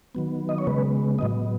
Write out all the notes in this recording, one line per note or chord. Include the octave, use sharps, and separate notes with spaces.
D#3 F#3 B3
D#5
C#5
C#3 G#3 B3 B4
A2 F#3 B3 D#5